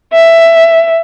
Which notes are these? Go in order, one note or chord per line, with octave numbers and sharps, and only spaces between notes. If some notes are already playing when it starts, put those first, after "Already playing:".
E5